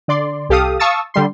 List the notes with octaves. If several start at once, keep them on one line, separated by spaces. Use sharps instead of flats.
D3 D5 C6
C2 G4 A4 F5 D#6
F5 A5 C#6 D#6 E6 A6
D3 G3 C6